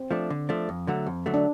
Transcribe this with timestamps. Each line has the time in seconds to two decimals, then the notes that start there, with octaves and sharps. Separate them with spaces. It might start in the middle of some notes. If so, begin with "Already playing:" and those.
Already playing: C4
0.11 F3 A3 D4
0.30 D3
0.49 F3 A3 D4
0.69 F2
0.87 D3 F#3 A3
1.06 F2
1.26 D3 F#3 A3
1.34 D4